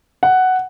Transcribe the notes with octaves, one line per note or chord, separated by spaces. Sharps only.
F#5